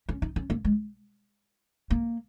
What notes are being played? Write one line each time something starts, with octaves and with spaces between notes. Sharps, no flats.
C#4
D#4
C#4
A#3
G#3
A#3